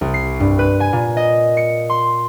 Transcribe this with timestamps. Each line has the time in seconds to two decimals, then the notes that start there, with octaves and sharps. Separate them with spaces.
0.01 C2
0.14 C7
0.40 G2
0.59 B4
0.80 G#5
0.93 A#2
1.17 D#5
1.57 C#7
1.89 C6